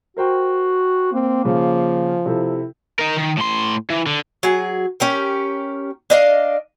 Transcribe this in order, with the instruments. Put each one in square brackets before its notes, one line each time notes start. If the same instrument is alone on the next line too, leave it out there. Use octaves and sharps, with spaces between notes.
[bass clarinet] F#4 [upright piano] A#4 C5 G5
[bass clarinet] A#3 [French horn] C4
[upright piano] C#3 [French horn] F3
[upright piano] C3 A4 [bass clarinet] E4
[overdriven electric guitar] D#4 A#4
D#3
A2 C6
E3
D3
[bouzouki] F#3 G#4
C#4 G4 A#4
D4 D#5 F5